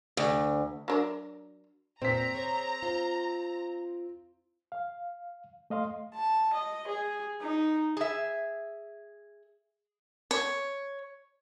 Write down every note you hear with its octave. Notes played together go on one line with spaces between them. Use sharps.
D2
F#3 D4 A#4
A#2 C4 A#5 B6
G#4 C5 C#5
F4 C5
F5
A3 D#5 F5 C6
A5
D#5
G#4
D#4
G#4 E5
C#5